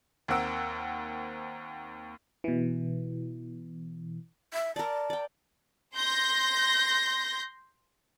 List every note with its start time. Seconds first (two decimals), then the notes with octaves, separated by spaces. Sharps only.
0.28 D#2 C4 A#4 F#5 E6 D7
2.44 B2 E3
4.53 E5
4.76 A#4 D5 A5
5.10 D5 G5
5.95 C6 G6 A#6